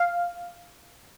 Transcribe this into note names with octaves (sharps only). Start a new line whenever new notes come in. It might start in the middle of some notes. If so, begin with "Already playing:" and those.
Already playing: F5